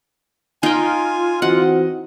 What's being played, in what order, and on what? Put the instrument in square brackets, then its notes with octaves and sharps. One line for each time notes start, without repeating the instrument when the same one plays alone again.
[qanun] D#4 G5 [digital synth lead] F4 [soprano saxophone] G#5
[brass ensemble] E3 C4 F#4 [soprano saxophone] D#5 [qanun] F#5